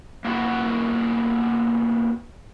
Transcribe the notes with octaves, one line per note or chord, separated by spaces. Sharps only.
A#3 B3 E4 F#4 F#5